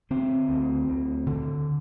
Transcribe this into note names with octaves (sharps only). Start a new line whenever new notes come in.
D3 C4
D2
D2
D3